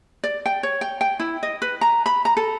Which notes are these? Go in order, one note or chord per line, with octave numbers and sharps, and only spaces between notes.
D5
G5
C#5
G5
G5
E4
D#5
B4
A#5
B5
A#5
A4